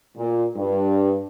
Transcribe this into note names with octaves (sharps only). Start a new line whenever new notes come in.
A#2
G2